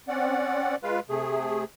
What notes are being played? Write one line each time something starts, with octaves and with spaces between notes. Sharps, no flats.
C4 C#4 D5 F#5
G#3 F4 B4 F5
C3 A3 G#4